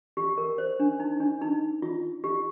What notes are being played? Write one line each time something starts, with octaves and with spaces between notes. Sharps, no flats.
G4
A#4
C5
D4
D#4
D4
D#4
F4
G4